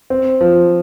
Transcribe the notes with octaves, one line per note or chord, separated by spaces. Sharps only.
C4
F3